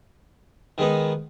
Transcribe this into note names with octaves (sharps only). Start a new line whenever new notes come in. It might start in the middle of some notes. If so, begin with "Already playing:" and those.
D#3 G#3 B3 D#4